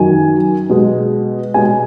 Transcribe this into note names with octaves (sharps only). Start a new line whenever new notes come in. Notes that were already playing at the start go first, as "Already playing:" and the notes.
Already playing: F#2 D#3 F#3 G#5
B2 G#3
B2 G#3 G#5